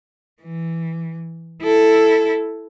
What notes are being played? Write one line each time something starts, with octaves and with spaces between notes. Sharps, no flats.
E3
E4 A4